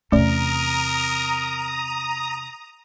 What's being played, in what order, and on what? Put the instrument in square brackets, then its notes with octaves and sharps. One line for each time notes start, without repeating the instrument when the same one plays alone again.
[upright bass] E2 C3 [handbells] A3 C#4 D5 [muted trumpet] A#4 [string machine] A#5 D#6